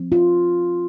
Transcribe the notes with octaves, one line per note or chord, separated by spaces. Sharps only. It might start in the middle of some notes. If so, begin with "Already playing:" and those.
Already playing: F3 C4
F4